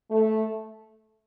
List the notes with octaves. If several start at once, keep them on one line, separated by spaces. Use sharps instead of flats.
A3